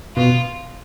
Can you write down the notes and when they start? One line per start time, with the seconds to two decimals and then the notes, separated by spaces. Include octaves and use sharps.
0.16 B2 F4